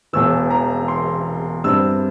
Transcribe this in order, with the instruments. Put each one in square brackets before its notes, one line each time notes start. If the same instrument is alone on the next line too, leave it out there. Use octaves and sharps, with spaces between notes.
[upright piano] E1 E2 E3 E6
A#5
C6
G2 G3 C4 E4 E6